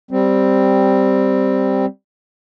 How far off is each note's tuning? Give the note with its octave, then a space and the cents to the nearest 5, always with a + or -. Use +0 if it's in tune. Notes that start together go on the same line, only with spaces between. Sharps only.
G3 +0 C4 +0